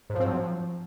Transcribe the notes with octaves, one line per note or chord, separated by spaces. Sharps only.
G#2
F3
C4
F#3
F3